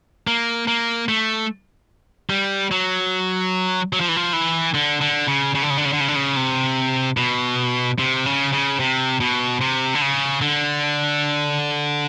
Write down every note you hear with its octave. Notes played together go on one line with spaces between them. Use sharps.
A#3
A#3
A3
G3
F#3
F#3
F3
E3
F3
E3
D3
D3
C#3
C#3
D3
C#3
D3
C#3
D3
C#3
D3
C#3
C3
B2
C3
C#3
C#3
C3
B2
C3
D3
C#3
D3